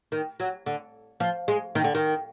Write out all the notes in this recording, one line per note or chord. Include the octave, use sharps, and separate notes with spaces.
D#3
F#3
D3
F3
G#3
D#3
D3
D#3